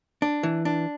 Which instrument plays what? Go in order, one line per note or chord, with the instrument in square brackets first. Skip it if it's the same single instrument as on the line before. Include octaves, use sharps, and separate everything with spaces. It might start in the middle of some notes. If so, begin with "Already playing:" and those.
[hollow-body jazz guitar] D4
E3
D4